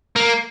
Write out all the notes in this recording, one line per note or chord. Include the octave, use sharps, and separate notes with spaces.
A#3